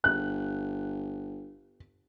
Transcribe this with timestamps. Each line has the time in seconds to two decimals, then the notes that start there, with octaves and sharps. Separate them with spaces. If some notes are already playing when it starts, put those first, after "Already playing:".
0.04 G1 F#6